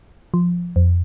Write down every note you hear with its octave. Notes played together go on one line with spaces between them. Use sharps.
F3
F2